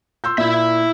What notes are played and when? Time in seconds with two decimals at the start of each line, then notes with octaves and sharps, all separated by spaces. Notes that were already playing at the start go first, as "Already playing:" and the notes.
0.24 C6 E6 G6
0.38 A#2 E4 E5